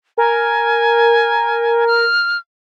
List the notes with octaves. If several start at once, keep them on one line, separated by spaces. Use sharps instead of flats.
A#4 G#5
F6